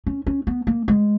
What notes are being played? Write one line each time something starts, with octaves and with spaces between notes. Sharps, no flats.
C#4
C#4
B3
A#3
G#3